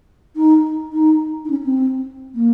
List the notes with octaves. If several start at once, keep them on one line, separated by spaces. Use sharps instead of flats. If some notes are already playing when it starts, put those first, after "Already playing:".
D#4
D#4
D#4
C#4
C4
A#3